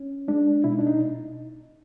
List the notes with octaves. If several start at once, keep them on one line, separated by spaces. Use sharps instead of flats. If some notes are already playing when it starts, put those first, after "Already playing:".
Already playing: C#4
G#3 D4
B2 E4
D#4
D4
D#4